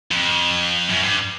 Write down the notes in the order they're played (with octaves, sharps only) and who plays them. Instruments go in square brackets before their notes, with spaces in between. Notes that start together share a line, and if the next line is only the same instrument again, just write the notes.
[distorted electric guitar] F2
F#2
G2